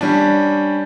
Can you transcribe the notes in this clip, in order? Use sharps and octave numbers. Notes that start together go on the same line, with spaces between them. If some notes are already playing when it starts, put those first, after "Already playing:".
G3 C#4 D4